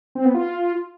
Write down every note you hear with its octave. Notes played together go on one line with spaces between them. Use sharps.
C4
B3
F4